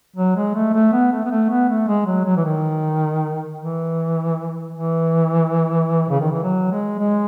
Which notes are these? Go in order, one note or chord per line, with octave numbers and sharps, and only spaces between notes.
F#3
G#3
A3
A3
B3
A3
B3
A3
B3
A3
G#3
F#3
F#3
E3
D#3
E3
E3
C#3
D#3
E3
F#3
G#3
G#3